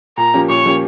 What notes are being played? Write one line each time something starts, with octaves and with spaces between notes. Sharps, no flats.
A#2 A#5
F3 A#3 C#4 G4
A#2 C#5
F3 A#3 C#4 G4